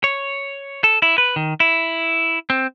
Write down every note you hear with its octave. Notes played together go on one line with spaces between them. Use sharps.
C#5
A4
E4
B4
D#3
E4
C4